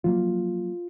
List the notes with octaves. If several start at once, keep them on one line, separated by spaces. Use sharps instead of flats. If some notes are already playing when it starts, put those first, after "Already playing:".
F3 F#3 A#3 F4